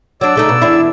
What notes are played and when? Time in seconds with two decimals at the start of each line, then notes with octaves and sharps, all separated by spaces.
0.21 F#3 D4 D5 E6
0.36 C#3 A3 D#4
0.49 B2
0.62 E2 D4 E4